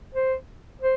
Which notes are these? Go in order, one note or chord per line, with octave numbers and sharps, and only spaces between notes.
C5
C5